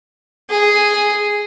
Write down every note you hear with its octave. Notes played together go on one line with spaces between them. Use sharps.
G#4